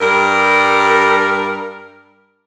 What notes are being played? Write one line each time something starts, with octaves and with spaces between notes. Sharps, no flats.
G2 G3 A#4